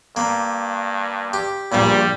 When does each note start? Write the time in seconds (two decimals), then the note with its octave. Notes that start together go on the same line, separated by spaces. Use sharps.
0.16 G2 A#3
1.34 G4
1.72 A#1 G2 A#2 G3